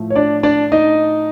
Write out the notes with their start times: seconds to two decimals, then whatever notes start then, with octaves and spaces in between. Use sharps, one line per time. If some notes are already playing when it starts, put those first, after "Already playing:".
Already playing: A2 F3 A3
0.10 C#5
0.16 D4 D5
0.43 D4 D5
0.72 D#4 D#5